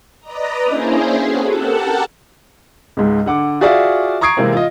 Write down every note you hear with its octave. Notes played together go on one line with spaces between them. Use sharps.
B4 D5 D#5 A#5
A#3 C#4 D4 E4 G#4 C5
C4 C#4 F#4 G#4 A4 B4
G4 A4 A#4 F#5 A5
C#2 G#2
D3 F#5 D6
F4 F#4 G#4 D5 E5 F5
A#5 C#6 D#6 G#6 C7 D7
C3 E3 G#3 A#3 C4
F4 D#5